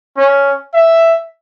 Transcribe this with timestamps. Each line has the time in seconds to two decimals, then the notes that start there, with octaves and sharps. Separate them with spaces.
0.17 C#4
0.74 E5